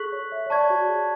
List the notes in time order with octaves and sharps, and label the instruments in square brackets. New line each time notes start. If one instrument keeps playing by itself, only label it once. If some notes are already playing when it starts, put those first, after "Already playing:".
Already playing: [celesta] G#4 A4 [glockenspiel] C#6 F#6 B6 F#7
[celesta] C#5
E5
C#5
[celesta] D5 [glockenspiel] A5 C#6 G#6
[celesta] F#4
F#4
G#4